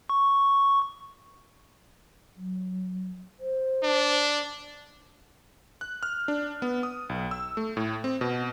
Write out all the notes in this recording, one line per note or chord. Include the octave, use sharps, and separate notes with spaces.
C#6
F#3
C5
D4
F#6
F6
D4
B3
D#6
B1
E6
A3
A2
C4
B2